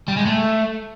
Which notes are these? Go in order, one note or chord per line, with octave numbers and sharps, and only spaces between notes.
G3
G#3
A3